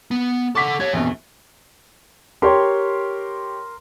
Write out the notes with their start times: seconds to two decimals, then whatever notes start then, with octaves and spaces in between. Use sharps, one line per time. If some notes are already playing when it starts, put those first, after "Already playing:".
0.11 B3
0.55 A4 F#5 C#6 D6 B6
0.80 G4 C#5 G#6
0.94 A#1 F2 B2 E3
2.42 G4 A#4 C#5 G5 C6